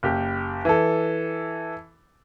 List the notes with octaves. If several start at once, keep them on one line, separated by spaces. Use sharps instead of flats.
F#1 G4
E3 A4